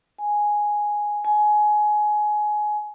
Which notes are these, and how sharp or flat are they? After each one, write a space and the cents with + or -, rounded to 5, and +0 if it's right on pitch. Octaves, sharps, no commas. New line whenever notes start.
G#5 +0
G#5 +20